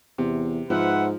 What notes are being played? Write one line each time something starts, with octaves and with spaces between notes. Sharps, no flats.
E2 C3
G#2 F3 B4 E5 F#5